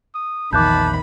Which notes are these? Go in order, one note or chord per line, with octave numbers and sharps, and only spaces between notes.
D#6
A#1 E2 D#3 A5 B5 D6 F#6 G6